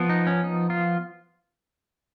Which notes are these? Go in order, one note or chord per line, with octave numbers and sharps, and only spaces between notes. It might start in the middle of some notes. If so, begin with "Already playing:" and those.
Already playing: F3 B3
D#4
C#4
D#4
F4